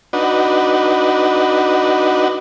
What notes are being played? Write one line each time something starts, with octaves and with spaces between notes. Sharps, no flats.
D4 D#4 F#4 B4